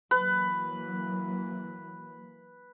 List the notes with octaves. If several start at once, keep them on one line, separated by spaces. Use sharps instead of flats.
E3 F#3 A#3 B4